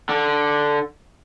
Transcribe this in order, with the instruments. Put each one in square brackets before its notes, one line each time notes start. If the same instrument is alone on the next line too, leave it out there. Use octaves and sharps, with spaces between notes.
[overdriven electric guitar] D3